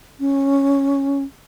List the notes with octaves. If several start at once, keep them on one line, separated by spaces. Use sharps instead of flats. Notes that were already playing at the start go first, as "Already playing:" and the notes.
C#4